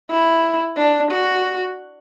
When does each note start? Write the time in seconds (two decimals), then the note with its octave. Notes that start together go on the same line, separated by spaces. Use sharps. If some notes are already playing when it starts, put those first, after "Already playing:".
0.10 E4
0.77 D4
1.11 F#4